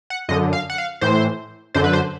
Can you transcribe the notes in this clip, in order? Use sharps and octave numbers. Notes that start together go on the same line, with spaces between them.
F#5
F#2 D3 D#5
F5
F#5
F5
A2 E3 C5
F#2 D3 C5
B4
C5